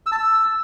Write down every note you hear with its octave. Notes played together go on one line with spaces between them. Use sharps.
E6
A5
E6